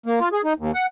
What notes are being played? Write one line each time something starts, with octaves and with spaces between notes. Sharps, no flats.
A#3
F4
G#4
D#4
D#2
F#5